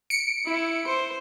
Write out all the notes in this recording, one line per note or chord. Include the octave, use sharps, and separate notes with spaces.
C#7 D7
E4
C5